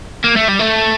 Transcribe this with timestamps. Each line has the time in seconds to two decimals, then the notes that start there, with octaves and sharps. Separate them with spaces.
0.24 A#3
0.36 A3
0.48 G3
0.59 A3